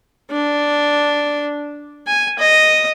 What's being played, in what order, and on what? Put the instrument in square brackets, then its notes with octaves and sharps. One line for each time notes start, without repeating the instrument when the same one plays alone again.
[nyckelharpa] D4
G#5
D#5